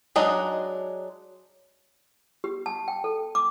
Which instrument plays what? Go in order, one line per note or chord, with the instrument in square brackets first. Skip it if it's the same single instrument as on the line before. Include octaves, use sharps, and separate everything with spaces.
[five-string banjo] F#3 G#3 D4 D#4
[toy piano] G4
A5
G5
A4
D6